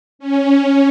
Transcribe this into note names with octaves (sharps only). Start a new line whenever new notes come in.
C#4